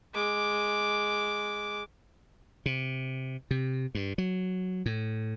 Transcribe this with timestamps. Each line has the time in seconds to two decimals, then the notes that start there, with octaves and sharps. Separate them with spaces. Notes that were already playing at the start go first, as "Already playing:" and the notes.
0.14 G#3 D6
2.66 C3
3.51 C3
3.95 G2
4.18 F#3
4.86 A2